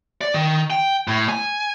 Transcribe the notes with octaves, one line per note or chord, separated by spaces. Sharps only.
D5
D#3
G5
A2
G#5